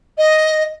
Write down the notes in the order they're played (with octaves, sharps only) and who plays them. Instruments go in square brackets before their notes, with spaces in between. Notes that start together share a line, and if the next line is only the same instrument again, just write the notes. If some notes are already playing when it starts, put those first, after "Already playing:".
[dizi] D#5